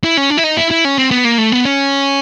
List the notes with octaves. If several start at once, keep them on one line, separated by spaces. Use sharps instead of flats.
E4
C#4
D4
E4
D#4
E4
E4
C#4
C4
B3
A#3
A3
B3
C#4